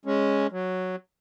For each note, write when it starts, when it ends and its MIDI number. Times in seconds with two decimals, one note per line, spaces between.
0.05 0.47 56
0.05 0.47 61
0.52 0.96 54